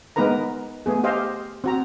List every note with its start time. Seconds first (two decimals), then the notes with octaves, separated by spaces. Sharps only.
0.16 G#3 B3 D#4 A#4 B4 A#5
0.86 A3 B3 G#4
1.04 G4 C5 D#5 F5
1.64 C4 F#4 A#5